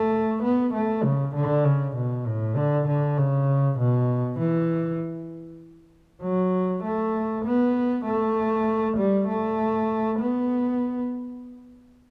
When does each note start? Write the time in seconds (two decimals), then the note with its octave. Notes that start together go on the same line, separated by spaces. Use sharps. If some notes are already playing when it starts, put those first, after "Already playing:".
Already playing: A3
0.42 B3
0.73 A3
1.03 C#3
1.35 D3
1.65 C#3
1.95 B2
2.26 A2
2.56 D3
2.87 D3
3.17 C#3
3.78 B2
4.39 E3
6.22 F#3
6.83 A3
7.45 B3
8.05 A3
8.97 G3
9.28 A3
10.19 B3